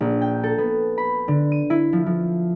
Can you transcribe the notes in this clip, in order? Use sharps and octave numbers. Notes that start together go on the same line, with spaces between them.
A#1
G5
A4
B3
B5
D3
D#7
E4
F3
F3